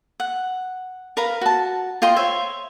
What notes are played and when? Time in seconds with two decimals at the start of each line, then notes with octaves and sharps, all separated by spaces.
0.20 F#5
1.17 A#4 B4 F5 A#5
1.41 F#4 A5
2.02 F4 D#5 G5 C6
2.16 C5 C#5 E5